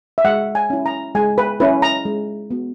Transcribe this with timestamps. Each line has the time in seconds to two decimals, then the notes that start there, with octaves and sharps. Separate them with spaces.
0.18 E5
0.25 G#3 F#5
0.55 G#5
0.70 C#4 E4
0.86 A#5
1.15 G#3 G#5
1.38 B4
1.60 C#4 E4 B4
1.82 A#5
2.05 G#3
2.50 B3 F#4